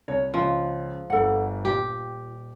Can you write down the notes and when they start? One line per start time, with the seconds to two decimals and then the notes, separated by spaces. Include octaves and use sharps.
0.08 C2 C#5
0.34 C#2 C#3 F3 C#4
1.10 G1 G2 A4 F#5
1.65 D#1 F4 G4 A#5